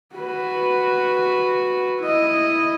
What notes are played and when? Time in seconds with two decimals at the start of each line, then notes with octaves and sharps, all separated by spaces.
0.16 F#4 B4
2.01 E4 D#5